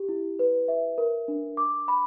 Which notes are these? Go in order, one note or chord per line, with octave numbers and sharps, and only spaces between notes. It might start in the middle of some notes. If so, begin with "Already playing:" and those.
Already playing: G4
E4
B4
E5
A#4
D4
D6
B5